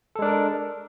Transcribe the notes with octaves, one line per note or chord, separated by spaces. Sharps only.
G#3 D4 A4 A#4